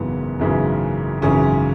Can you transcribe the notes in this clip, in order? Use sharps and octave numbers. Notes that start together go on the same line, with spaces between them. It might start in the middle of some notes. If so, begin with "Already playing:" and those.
Already playing: G#1 F#2 C#3 E3 B3
G#1 F#2 C#3 E3
G#1 F#2 C#3 E3 C#4